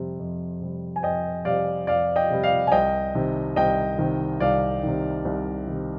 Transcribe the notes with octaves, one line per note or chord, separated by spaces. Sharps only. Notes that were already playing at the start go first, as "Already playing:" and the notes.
Already playing: F2 C3 G3
F2
C3 G3
G#5
F2 D#5 G5
C3 G3 D5 F5
F2 D5 F5
D#5 G5
C3 G3
D5 F5
G#5
C2 D#5 G5
C3 D#3
C2 D#5 G5
C3 D#3
C2 D5 F5
C3 D#3
C2
C3 D#3